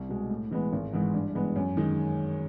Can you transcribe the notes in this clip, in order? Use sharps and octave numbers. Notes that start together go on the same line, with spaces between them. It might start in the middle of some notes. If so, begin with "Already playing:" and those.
Already playing: C2
B2 G#3
A2
E3 G#3 B3
G#1
G#2 E3 G#3
G2
E3 G#3 B3
F#2
D#3 G#3